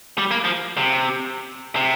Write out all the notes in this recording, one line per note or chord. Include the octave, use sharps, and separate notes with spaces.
G3
A#3
F3
C3
C3